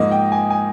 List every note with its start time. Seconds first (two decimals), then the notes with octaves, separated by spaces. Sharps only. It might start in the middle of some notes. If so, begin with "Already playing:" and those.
Already playing: G#2 F3 A#3 D#5
0.11 G5
0.32 G#5
0.50 G#5